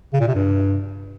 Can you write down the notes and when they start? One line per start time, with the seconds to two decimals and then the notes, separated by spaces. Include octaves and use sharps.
0.13 C#3
0.20 A#2
0.28 C3
0.35 G2